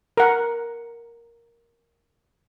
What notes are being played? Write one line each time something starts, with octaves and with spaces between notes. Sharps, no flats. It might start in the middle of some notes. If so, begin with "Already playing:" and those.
A#4 F#5